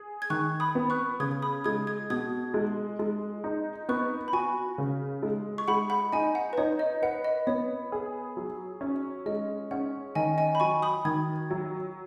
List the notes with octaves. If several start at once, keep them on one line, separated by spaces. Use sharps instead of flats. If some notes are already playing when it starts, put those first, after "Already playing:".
Already playing: G#4
G#6
D#3 C#6 F#6
B5 D#6
B3
C#6 F#6
C#3 D#6 G#6
B5 D#6
G#3 D#6 G#6
D#6 G#6
B2 D#6 G#6
G#3
G#3
D#4
B3 C#6 F#6
B5
F#4 G#5 C#6
C#3
G#3
C#6
G#3 F#5 B5
F#5 B5
D#4 D#5 G#5
F#5
B4
D#4 C#5
D#5
B4 F#5
D#5
B3 C#5
G#4
F#3
C#4
G#3 D#5
C#4 F#5
D#3 D#5 G#5
D#5 G#5
B5
F#3 G#5 C#6
B5 D#6
D#3 D#6 G#6
F#3